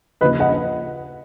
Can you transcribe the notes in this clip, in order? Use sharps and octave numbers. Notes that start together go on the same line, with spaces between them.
D#2 C#3 F3 B4 D#5
D#5 F#5